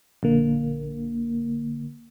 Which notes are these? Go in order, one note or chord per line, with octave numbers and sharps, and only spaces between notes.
A#1 D3 A#3